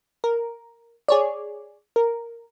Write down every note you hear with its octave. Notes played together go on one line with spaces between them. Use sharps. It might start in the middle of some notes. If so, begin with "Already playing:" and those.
A#4
G#4 C#5 D5
A#4